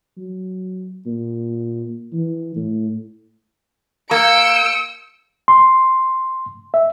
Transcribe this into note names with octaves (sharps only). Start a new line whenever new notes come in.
F#3
A#2
E3
A2
A#3 F5 E6 G6 G#6 C#7 D7
C6
E5